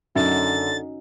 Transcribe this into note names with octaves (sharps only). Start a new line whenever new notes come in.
F#2 D3 C#4 D#4 F#4 A6